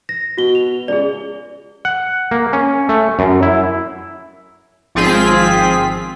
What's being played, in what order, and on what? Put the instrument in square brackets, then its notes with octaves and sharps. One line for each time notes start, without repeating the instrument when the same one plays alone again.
[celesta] A#6
[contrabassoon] B2 [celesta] F#4 G7
[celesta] F7
[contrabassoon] C#2 [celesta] G#4 D5
[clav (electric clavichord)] F#5
A#3
C#4
A3
F#2
E4
[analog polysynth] G#1 F3 C4 F4 G#4 B6